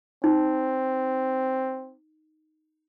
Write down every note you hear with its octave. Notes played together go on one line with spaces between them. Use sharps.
C4 D#4